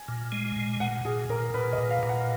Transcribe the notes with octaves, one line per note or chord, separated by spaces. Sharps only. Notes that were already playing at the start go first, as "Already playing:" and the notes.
Already playing: G#5
A#2
G#3
A#2
A#2 F#5
A#2 G#4
A#2 A#4
A#2 B4
D#5
A#2
F5
A#2
F#5